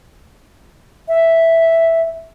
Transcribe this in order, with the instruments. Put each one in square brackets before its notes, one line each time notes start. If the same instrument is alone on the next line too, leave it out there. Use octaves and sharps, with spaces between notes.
[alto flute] E5